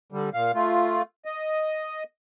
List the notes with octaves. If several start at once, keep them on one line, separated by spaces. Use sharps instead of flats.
D3 G3
A#2 F5
A3 F4
D#5